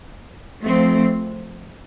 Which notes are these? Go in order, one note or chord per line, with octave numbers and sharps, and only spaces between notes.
F3 A3 C4